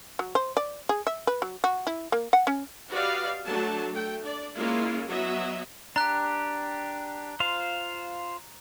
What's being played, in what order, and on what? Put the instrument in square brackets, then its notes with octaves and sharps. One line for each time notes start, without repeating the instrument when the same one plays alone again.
[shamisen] F#3
C5
D5
G#4
E5
B4
F#3
F#4
E4
A#3
F#5
C#4
[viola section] F#4 G4 B4 D5 D#5 F5
F#3 A3 D4 A5
A3 G5
D4 D5
G#3 A#3 C#4 E4 F4
F#3 B3 D#5 E5
[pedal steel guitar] D4 G4 [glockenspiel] A#5 F#6
[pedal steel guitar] F4 C5 F5